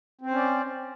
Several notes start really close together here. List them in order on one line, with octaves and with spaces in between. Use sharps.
C4 C5 C#4 D5